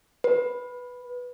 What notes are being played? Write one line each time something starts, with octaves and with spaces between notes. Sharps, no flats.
B4